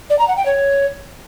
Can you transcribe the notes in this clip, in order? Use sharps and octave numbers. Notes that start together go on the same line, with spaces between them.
D5
A#5
F#5
G5
C#5